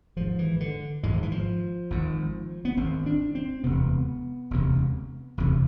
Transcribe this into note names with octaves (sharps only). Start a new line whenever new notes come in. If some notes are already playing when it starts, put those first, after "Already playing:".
G#1 G#2 F3
E3
D3
G#1 G#2 G#3
F3
E3
F3
G#1 G#2
B3
G#1 G#2 C4
D4
C4
E1 D2 C3 B3
E1 D2 C3
E1 D2 C3